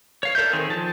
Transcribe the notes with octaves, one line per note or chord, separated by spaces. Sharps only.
C#5 F5
A4 A#4 D5 E5 G6
D#3 C4 G#4
F3 A5